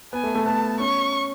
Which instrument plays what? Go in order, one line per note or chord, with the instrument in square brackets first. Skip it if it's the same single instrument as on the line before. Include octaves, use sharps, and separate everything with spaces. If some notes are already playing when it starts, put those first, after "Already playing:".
[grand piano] B3 [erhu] G#5
[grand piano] A3
A3
[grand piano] B3 [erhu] A5
[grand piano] C#4 [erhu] C#6